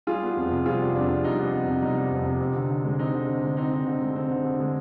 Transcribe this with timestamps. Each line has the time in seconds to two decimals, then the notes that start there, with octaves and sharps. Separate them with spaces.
0.07 G3 F4 G#4
0.22 B3
0.37 F2
0.51 C3
0.66 G3 F4 G#4
0.81 B3
0.95 F2 D4
1.10 C3
1.24 G3 D#4
1.39 B3
1.53 F2
1.68 C3
1.82 G3 D#4
1.97 B3
2.11 F2
2.27 C3
2.40 C4
2.55 D3
2.70 D3
2.84 G#3
2.99 C4 D#4
3.13 D3
3.28 D3
3.43 G#3
3.57 C4 D#4
3.72 D3
3.86 D3
4.01 G#3
4.16 C4
4.30 D3
4.45 D3
4.60 G#3